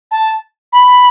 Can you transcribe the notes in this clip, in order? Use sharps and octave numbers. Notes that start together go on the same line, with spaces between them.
A5
B5